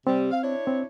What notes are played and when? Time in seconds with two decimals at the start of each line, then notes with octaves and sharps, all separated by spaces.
0.07 C3 G3 C4
0.31 F5
0.43 D4 E4 C#5
0.67 C4